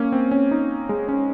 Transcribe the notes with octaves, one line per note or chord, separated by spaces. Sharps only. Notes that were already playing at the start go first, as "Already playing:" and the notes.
Already playing: A#3 C#4
C4
C#4
D#4
G#3
C#4